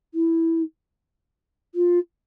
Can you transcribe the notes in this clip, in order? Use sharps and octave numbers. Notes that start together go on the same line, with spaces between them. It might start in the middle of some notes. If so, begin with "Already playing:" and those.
E4
F4